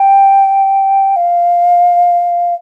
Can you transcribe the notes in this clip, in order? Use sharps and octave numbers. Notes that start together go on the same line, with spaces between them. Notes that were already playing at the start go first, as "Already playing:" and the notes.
Already playing: G5
F5